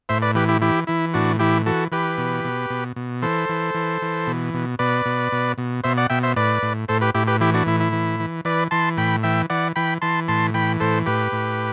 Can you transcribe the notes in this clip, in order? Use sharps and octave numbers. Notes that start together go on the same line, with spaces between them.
A2 C5 E5
B4 D5
E3 G4 B4
E4 G4
E3 E4 G4
E3 E4
A2 D4 F#4
E3 E4 G4
E3 F#4 A4
E3 G4 B4
B2
B2
B2
B2
E3 A4 C5
E3
E3
E3
B2
B2
B2 B4 D5
B2
B2
B2
B2 C5 E5
D5 F#5
B2 E5 G5
C5 E5
A2 B4 D5
A2
A2 A4 C5
G4 B4
A2 E4 G4
G4 B4
E3 E4 G4
D4 F#4
A2 E4
E4
E3
E3
E3 B4 D5
E3 A5 C6
A2 G5 B5
E3 E5 G5
E3 D5 F#5
E3 G5 B5
E3 A5 C6
A2 A5 C6
E3 G5 B5
A2 A4 C5
A2 G4 B4
A2